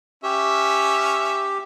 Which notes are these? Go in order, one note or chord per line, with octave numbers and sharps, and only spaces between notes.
C#4 G4 E5